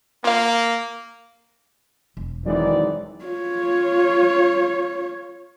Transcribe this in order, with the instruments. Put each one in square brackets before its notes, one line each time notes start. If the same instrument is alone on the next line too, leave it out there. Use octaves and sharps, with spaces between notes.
[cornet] A#3 [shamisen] F4 F5
[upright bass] E1
[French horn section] F#2 C4 D5 [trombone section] D#3 E3 [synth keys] F#3 G#3 D#4
[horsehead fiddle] F4 C#5